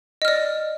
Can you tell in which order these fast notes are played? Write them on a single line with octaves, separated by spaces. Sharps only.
D#5 F6 D5